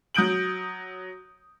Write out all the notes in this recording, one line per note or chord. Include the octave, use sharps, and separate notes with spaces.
F#3 D#6 G6 D7 F#7